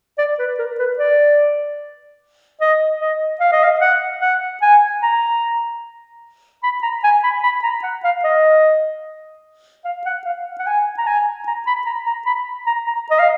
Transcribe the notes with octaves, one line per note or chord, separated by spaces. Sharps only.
D5
B4
A#4
B4
D5
D#5
D#5
F5
D#5
F5
F#5
F#5
G#5
A#5
B5
A#5
G#5
B5
B5
A#5
F#5
F5
D#5
F5
F#5
F5
F#5
G#5
A#5
G#5
A#5
B5
A#5
A#5
B5
A#5
A#5
D#5
F5